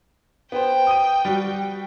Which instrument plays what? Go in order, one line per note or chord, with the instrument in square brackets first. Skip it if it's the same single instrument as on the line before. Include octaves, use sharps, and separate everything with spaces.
[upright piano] B3 C5 [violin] G5
[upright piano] D#6 D#7
G3 F#4